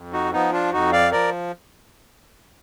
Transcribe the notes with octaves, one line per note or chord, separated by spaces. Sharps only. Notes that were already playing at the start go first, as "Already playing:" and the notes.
Already playing: F2
D#4 F#4
F3 B3 D#4
D4 F4
F2 D#4 F#4
D5 F5
F3 A#4 D5